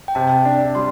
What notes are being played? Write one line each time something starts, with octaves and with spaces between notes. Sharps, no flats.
G5
C3 A5
D4
G3 C6